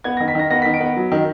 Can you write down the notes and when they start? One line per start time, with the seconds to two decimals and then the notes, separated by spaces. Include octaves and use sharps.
0.04 B3 G#6
0.17 D#3 A#6
0.28 B6
0.35 D#3 A#6
0.50 B3 A#6
0.62 D#3 B6
0.74 D7
0.81 B3
0.97 F#3
1.12 D#3